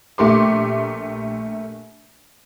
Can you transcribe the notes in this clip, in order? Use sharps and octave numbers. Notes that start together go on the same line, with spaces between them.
A#1 A3 G4 A#4 C6 D6